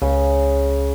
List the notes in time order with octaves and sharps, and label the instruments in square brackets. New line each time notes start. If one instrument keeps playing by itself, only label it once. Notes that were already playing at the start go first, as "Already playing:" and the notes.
[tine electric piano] C#2 [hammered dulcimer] C#3